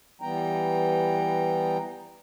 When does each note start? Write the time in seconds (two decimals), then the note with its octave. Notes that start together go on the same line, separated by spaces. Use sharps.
0.21 E3 G3 B3 G5 A#5